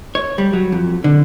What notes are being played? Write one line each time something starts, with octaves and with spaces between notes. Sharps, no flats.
C#5
G3
F#3
F2
D3